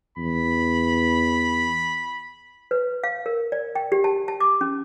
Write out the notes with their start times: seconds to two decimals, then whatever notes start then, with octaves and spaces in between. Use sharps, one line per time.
0.18 E2 B5
2.71 B4
3.04 F5
3.26 A#4
3.52 D5
3.75 G5
3.92 G4
4.04 A5
4.28 A5
4.40 D6
4.61 C#4